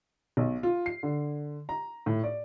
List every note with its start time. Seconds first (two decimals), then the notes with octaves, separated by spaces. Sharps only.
0.37 B1
0.63 F4
0.86 C7
1.03 D3
1.69 A#5
2.06 A2
2.24 D5